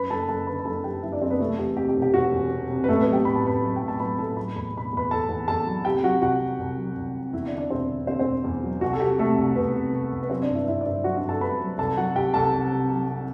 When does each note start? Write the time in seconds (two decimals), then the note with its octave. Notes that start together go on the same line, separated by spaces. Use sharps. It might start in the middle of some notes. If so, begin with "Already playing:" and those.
Already playing: F#2 B4 B5
0.10 F#1 A4 A5
0.29 F#1 A4 A5
0.47 D3 B4 B5
0.59 B5
0.65 F#1 A4 A5
0.84 F#1 G4 G5
1.03 F#1 E4 E5
1.12 D4 D5
1.22 F#1 C4 C5
1.31 B3 B4
1.40 C3 A3 A4
1.58 E2 G4
1.77 C3 G4
1.89 G4
1.96 E1
2.02 G4
2.14 E1 F#4
2.32 E2
2.51 C3
2.70 C3
2.84 B4
2.88 A1 A3 A4
3.01 B3 B4
3.07 F#3
3.13 G4 G5
3.25 A2 B5
3.36 A5
3.45 A1 B4 B5
3.62 F#3
3.76 A2 G5
3.88 A5
4.00 F#3 B4 B5
4.18 A2 A4 A5
4.37 F#3 B5
4.55 E2 B5
4.74 B2 B5
4.93 E2 B4 B5
5.11 E2 A4 A5
5.29 E2
5.48 E2 A4 A5
5.67 F#3
5.85 C3 G4 G5
6.03 F#3 F#4 F#5
6.22 C2 F#4 F#5
6.40 C2
6.59 C2
6.78 F#3
6.97 C2
7.15 C3
7.33 E2 E4 E5
7.46 D4 D5
7.52 D3
7.58 D4 D5
7.70 E1 C4 C5
7.89 D3
8.07 D3 C4 C5
8.19 C4 C5
8.26 E1
8.44 E2
8.63 F#3
8.81 C2 F#4
8.93 A4
9.00 C3 G4
9.19 C3 A3 A4
9.37 C2
9.55 C2 B3 B4
9.75 C2
9.93 C2
10.12 C2
10.23 B4
10.30 F#3 C4 C5
10.42 D4 D5
10.49 G2
10.54 E4 E5
10.67 G2 E4 E5
10.81 D5
10.86 G1 E4 E5
11.04 F#3 F#4 F#5
11.16 D4 D5
11.24 G1
11.29 A4 A5
11.41 G2 B4 B5
11.60 F#3
11.78 C2 A4 A5
11.97 F#3 F#4 F#5
12.15 C2 G4 G5
12.34 C2 A4 A5
12.53 C2
12.71 C3
12.89 F#3
13.08 C3